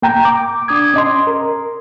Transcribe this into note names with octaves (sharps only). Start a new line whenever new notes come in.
A#3 G5 A#5 G6
D6
D4 D6 D#6 G#6
C#4 D#5 C6
A#4